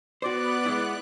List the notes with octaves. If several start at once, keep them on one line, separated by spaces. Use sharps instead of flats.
B3 F#4 C5 D5 F#6
G#3 E4